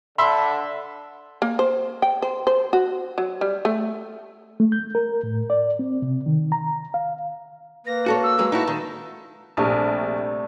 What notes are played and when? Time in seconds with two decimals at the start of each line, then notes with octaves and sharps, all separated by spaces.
0.18 D3 E5 B5 C6
1.42 A#3
1.59 C5
2.02 G5
2.22 C5
2.47 C5
2.73 F#4
3.18 F#3
3.41 G3
3.65 A3
4.60 A3
4.72 G6
4.95 A#4
5.23 A2
5.50 D5
5.79 C4
6.02 C3
6.26 D#3
6.52 A#5
6.94 F5
7.86 A#3 B4 A#6
8.06 F#4 A4 C#5
8.23 E6
8.39 F#3 G#3
8.52 D#4 E4 F#4 A5
8.68 D#3
9.57 A#1 C3 G3 A3